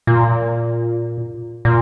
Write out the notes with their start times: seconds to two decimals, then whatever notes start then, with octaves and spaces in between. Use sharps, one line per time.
0.07 A#2
1.65 A#2